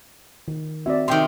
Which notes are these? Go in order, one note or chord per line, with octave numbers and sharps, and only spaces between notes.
D#3
C4 F#4 D5 E5
C3 D#3 G4 G5 C6